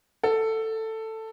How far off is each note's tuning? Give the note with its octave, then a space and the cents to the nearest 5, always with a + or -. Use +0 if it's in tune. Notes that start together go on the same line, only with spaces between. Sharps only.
A4 +10